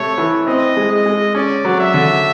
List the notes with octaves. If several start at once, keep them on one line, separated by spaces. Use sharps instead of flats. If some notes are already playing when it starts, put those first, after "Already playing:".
Already playing: C3 A3 C#5
E3
C4 D#5
G#3
D#5
G#3
C#4 D5
F#3
E5
D3